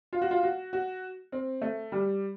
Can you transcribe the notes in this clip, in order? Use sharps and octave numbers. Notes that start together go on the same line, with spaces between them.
F4
F#4
F4
F#4
F#4
C4
A3
G3